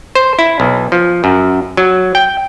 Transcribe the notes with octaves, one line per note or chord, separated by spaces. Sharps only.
C5
E4
B1
F3
F#2
F#3
G5